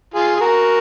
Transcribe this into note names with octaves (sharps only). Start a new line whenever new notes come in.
F4 G#4
G#4
F#4 A#4